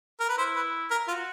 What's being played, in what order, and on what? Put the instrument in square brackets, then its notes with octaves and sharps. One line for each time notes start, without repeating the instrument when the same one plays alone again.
[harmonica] A#4
B4
[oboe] E4 [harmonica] C5
[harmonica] B4
A#4
[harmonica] F4 [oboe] F#4